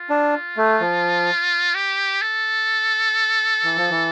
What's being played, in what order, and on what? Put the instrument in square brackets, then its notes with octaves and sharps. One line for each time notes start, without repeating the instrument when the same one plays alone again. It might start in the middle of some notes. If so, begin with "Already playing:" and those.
Already playing: [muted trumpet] F4
[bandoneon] D4
A3
F3
[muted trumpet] G4
A4
[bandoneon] E3
F3
E3